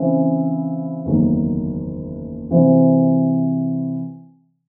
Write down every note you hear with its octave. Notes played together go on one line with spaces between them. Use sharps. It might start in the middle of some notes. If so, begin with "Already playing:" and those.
Already playing: C#3 E3 C4 E4 C5
F#1 E2 D#3 F#3 A3
C3 E3 C4 F#4 C5